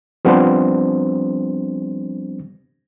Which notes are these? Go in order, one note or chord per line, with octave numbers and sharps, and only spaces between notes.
F3 G3 B3 C4 D4 C5